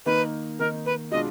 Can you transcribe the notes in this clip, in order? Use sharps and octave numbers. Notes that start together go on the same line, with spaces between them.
D#3 A#3 D#4 B4
D#3 A#3 D#4 A#4
B4
B2 G#3 D4 F4 D#5